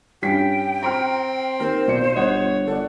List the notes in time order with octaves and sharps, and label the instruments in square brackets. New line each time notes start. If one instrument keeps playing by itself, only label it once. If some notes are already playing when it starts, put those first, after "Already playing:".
[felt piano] G2 C#4 B6 [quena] G5
[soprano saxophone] C4 [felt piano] A#5 C6 F6
[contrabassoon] D#2 [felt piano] A#4 [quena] C5
[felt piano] B1 D5 C#7 [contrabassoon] B2
[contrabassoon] G1 [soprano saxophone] C#5 [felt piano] D#5 F#5
[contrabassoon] G1 [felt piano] A4 D5 [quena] F#5